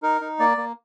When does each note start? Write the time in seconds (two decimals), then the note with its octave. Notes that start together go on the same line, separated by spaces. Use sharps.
0.03 D#4 A#4
0.21 D#4
0.39 A#3 D5
0.57 A#3